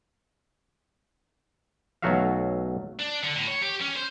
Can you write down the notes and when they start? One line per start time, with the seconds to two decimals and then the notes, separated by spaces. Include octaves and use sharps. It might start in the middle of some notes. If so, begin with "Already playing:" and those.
2.02 B1 F#3 A3 F#4 E5 F5
3.00 D4
3.23 D3
3.35 A2
3.47 C#5
3.61 G4
3.81 C#4
3.96 C5